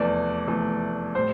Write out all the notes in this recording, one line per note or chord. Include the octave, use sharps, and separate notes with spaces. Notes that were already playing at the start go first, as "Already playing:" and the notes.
Already playing: F1 E2 E3 A3 D5
F1 E2 E3 A3
A2 G3 C5